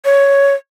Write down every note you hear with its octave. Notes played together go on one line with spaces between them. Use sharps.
C#5